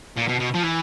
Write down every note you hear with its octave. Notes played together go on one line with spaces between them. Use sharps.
A#2
B2
B2
F3
E3